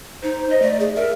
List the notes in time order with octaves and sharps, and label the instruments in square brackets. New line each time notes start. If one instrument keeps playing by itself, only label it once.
[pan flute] D#4 [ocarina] C5
[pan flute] D#5
[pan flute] A3 [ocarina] D5
[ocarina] G#4
[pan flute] A#4 [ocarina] E5